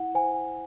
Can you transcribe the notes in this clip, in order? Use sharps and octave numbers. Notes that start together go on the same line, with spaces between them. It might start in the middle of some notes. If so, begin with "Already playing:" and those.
Already playing: E4 F#5
C5 G#5